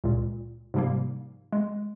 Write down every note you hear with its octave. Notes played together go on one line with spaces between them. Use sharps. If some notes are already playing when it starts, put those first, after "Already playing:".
C#2 A#2
G#2 C3 F3 G3 A#3
G#3